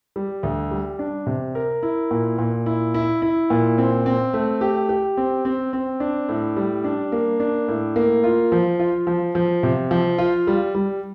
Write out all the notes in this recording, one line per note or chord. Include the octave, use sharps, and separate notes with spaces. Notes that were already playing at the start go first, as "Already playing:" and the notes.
G3
D2
G3
D4
C3
A#4
E4
A#2
A#2
E4
E4
E4
A#2
C4
C4
A3
G4
G4
C4
C4
C4
D4
A2
G3
D4
A#3
D4
A2
A#3
F4
F3
F4
F3
F3
C3
F3
F4
G3
G3